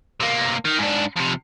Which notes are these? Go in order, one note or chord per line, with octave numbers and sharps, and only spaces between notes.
C3 A#3
D#3
G#2 D4
F2 C3